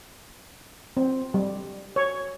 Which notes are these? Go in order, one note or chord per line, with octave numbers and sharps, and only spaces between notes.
C4
G3
C#5